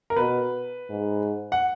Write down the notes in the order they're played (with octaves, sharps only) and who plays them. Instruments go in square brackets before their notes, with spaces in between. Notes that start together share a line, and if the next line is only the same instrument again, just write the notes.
[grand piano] A#4
[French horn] B2 [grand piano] B4
[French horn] G#2
[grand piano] F#5